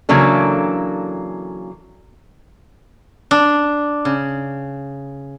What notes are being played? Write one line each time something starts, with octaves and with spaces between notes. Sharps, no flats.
C#3 E3 F#3 A#3 D4 A4
D4
C#3